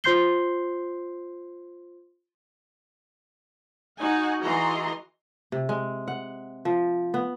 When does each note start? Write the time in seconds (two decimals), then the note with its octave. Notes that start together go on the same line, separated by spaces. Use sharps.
0.04 F4 C5 C6 G6 C7 G7
4.01 D#4 F#4 F#5 G#5
4.42 E3 F#4 G#4 D#5 A#5 C6
5.52 C3
5.69 G#3
6.08 F#5
6.65 F3
7.14 B3